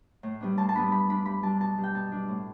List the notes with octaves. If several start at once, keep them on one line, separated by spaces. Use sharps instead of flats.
A2
G3 B3 D4
A2 A5
A5
G3 B3 D4 B5
G2 B5
G3 D4 B5
G2 B5
G3 D4 A5
B2 A5
G3 D4
G5
B2 A5
G3 D4
A2